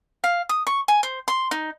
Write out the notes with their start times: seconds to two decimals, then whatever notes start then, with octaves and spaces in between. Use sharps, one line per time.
0.24 F5
0.49 D#6
0.67 C#6
0.88 G#5
1.03 C5
1.28 C6
1.51 D#4